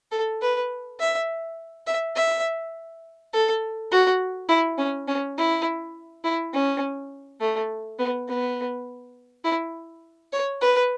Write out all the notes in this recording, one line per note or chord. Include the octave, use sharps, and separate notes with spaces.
A4
B4
E5
E5
E5
A4
F#4
E4
C#4
C#4
E4
E4
C#4
A3
B3
B3
E4
C#5
B4